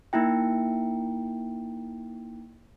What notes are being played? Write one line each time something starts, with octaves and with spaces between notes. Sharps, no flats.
A#3 D#4 E4 G5